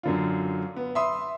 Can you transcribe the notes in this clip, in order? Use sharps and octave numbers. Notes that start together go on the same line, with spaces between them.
F#2 D3 F4
B3
E5 B5 C6 D#6